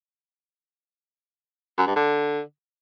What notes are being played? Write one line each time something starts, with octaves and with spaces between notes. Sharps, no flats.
F#2
G2
D3